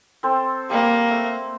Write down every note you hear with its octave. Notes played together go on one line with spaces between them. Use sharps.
C4 A4 C5
G3 A#3
A3